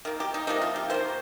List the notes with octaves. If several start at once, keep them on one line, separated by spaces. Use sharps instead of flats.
D#3 A#3
G4
D#4
C3 F3 A#3 D#4
F4
G4
D#3 A#3 C5